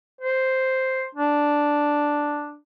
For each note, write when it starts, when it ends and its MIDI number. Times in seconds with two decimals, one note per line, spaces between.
0.21 1.04 72
1.15 2.58 62